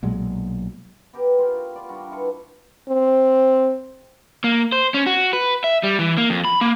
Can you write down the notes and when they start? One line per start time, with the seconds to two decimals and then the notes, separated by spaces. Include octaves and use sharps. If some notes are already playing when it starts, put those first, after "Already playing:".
0.03 B1 A#2 F#3 G#3
1.13 B3 G4 A#4
1.39 F4 G#4 G5 B5
1.54 F#4
1.75 F4 D5
1.89 G3 D4 F#4 A#4
2.11 E4 F4 A4 B4
2.89 C4
4.44 A#3
4.72 C5
4.94 C#4
5.06 F#4
5.33 B4
5.64 E5
5.83 G3
5.99 E3
6.17 A#3
6.30 F2
6.45 B5
6.61 A#3